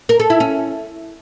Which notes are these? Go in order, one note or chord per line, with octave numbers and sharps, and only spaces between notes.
A#4
A4
E4
C#4